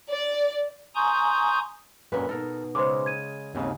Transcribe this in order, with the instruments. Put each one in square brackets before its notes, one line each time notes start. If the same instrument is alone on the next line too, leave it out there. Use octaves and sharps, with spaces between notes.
[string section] D5
[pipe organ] G#5 A#5 C6 C#6 D#6 G6
[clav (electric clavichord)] F#2 A#2 [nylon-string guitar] C#4 A#4 B4
[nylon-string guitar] B2 D#4 [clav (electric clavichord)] A4 A#4
[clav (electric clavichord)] C#3 G#3 [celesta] C5 C6 D6
[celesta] G#6 D#7
[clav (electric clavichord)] D#2 G#2 C#3 [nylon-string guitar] C4 D#4